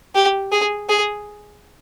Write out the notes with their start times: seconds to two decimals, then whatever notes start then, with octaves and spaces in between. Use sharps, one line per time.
0.15 G4
0.52 G#4
0.89 G#4